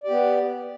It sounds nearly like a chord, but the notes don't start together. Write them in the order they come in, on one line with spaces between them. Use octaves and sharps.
D5 G4 B3